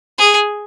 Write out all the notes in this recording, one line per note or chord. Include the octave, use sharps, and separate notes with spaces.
G#4